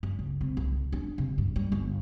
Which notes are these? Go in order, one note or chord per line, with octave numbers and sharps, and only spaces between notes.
G2
C#2
C3
C2
D4
C3
G2
G3
G1